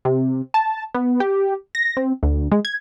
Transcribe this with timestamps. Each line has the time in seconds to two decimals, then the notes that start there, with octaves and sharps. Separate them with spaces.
0.05 C3
0.54 A5
0.95 B3
1.20 G4
1.75 A#6
1.97 C4
2.23 D2
2.52 G#3
2.65 G#6